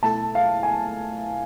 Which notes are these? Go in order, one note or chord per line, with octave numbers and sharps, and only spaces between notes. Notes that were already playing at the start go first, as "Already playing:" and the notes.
B2 A3 E4 A4 A5
F5
G#5